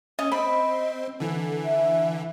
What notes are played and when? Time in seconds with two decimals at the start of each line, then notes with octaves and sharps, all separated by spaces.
0.19 C#4 D#5
0.32 C4 D#5 B5
1.20 D3 E3 A4
1.64 E5